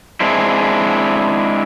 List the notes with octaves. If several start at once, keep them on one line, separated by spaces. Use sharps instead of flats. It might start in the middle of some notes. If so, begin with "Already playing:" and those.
G#3 C4 D4 E4